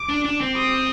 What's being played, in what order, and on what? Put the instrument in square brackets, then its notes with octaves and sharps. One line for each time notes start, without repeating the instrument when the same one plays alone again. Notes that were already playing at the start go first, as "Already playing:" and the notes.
Already playing: [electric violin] D6
[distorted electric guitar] D4
D4
C4
[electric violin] D#6